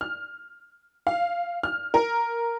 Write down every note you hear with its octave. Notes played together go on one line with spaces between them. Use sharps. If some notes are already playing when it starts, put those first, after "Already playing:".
F6
F5
F6
A#4